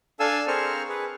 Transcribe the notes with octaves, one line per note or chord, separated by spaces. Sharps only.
D4 A4 F5 G#5 E6
C4 G#4 A#4 C5 C#6 F6
G#4 B4